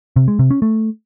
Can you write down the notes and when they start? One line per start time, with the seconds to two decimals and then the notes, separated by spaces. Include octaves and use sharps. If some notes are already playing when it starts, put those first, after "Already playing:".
0.16 C3
0.28 G#3
0.39 C3
0.51 C#4
0.62 A3